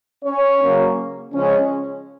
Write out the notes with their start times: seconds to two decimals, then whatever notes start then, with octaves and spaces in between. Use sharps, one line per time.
0.24 C#4 C#5
0.61 C#3 F#3 A#3 C#4
1.32 C#3 F3 G#3 C#4